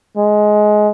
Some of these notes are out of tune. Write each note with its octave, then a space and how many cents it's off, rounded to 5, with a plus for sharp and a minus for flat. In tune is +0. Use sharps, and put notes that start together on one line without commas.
G#3 +15